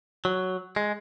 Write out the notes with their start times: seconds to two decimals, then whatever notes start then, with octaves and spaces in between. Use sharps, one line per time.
0.25 F#3
0.76 G#3